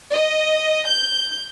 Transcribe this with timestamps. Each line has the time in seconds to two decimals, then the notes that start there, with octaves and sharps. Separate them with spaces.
0.12 D#5
0.86 G6